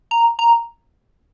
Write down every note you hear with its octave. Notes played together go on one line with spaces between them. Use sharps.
A#5
A#5